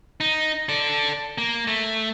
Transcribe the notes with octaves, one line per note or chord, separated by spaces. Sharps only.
D#4
A4 D5
A#3
A3